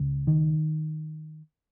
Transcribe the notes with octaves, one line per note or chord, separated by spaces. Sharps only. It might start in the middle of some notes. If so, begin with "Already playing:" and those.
Already playing: C#2 C#3
D#3